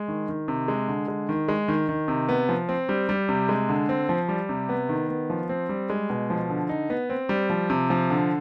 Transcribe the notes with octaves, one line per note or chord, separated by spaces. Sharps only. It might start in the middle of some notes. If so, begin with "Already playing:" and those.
Already playing: G#3
D#3
D#3
C3
G#3
D3
G#3
D#3
G#3
D#3
D#3
C3
B3
F3
C4
G3
G3
C3
G#3
D3
C4
F3
G3
C3
B3
D#3
B3
F3
C4
G3
G#3
B2
F3
D3
D#4
B3
C4
G3
F3
C3
F3
D3